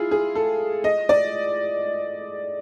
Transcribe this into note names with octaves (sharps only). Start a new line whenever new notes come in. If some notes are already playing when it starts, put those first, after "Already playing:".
Already playing: E4 F4 G#4
G#4
A4
D#5
D5